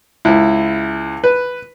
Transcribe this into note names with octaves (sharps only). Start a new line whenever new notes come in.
C#2 E4
B4